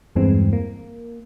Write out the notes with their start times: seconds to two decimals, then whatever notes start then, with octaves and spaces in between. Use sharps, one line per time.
0.16 E2 G2 E3 G#3 C4
0.53 A#3